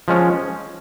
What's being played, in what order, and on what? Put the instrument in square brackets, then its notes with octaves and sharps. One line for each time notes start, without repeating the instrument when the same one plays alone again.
[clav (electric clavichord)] F3 G#3 C#4